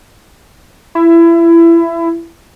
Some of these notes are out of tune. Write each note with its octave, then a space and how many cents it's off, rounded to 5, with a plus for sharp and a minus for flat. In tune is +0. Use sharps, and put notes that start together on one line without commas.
E4 +25